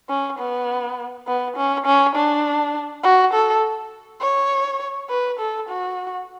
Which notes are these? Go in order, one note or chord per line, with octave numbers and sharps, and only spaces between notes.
C#4
B3
B3
C#4
C#4
D4
F#4
A4
C#5
B4
A4
F#4